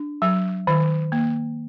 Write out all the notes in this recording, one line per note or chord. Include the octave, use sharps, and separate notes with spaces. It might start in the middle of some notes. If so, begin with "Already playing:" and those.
Already playing: D4
F#3
D#3
A#3